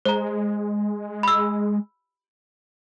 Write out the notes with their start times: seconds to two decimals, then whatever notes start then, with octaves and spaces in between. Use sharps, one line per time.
0.05 G#3 C5 A#5
1.23 B5 E6